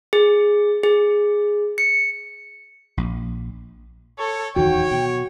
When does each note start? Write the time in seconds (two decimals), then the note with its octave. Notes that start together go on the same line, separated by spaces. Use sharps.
0.13 G#4
0.84 G#4
1.78 C#7
2.97 A#1
4.19 A4 C#5
4.56 D1 E2 D#3 F#4 C#5 G5
4.91 B2